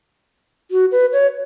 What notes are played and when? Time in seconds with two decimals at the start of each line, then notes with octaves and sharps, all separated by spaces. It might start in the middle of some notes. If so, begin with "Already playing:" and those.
0.71 F#4
0.92 B4
1.13 C#5